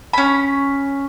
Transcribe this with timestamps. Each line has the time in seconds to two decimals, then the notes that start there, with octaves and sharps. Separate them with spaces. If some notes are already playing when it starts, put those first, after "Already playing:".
0.13 C#4 B5